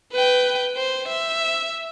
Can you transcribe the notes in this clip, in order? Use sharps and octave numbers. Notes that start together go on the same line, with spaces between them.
B4 G5
C5
E5